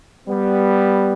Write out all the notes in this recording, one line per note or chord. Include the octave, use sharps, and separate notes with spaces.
G3 B3